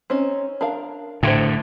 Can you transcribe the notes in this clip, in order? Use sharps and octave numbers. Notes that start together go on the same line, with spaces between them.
C4 C#4 D#4
D4 A#4 F5
A2 D3 F#4 C5